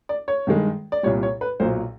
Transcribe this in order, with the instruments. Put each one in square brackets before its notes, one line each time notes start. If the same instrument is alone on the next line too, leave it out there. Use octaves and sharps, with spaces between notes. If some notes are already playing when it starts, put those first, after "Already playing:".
[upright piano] D5
C#5
G2 D#3 G#3
D5
C2 A#2 G3 C#5
C#5
B4
B1 A#2 F#3 C5